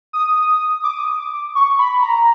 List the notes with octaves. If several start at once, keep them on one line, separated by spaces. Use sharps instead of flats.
D#6
D6
D#6
D6
C#6
B5
A#5